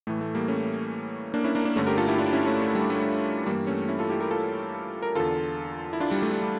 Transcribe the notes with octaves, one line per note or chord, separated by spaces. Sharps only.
A2 E3 A3
A3
G3 A#3
A3 C#4
A#3 D4
C#4 E4
A#3 D4
A#3 D4
G2 D3 A3 C#4
G4 A#4
F4 A4
E4 G4
D4 F4
C#4 E4
A3 C#4
A3
G3
A3
G2 E3 G3 A#3
A3 C#4
C#4 E4
F4 A4
E4 G4
G4 A#4
F4 A4
A#4
E2 D3 F4 A4
E4
D4 F4
G3
A3
A3
G3